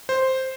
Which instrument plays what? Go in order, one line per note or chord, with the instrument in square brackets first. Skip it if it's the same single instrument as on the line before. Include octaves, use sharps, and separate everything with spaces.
[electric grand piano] C5